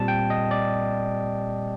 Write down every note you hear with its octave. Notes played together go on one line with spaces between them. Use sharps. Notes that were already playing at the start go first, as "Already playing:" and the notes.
Already playing: A#2 G3 C4 A5
G5
D#5
D5